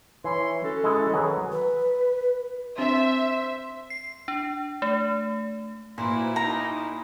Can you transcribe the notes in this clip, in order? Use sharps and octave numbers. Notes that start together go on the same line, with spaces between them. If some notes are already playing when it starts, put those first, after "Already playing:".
E3 C#5 E5 C6
C#4 F#4 A4
G#3 E4
D#3 E3 F#3 G#4 B4
B4
C4 D4 C5 E5
C7
D4
A3
A#2 E4 F#4 B4 C5
A#3 D#4 F#4 A#5